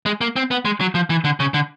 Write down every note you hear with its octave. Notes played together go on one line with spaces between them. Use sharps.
G#3
A#3
C4
B3
G#3
F#3
F3
E3
D3
C#3
D3